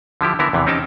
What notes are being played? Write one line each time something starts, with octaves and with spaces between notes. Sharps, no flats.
D3 F3 E4 G4
D3 E3 B3 E4 A#4
E2 C3 E3
C4 C#4 D#4 G4 G5 A5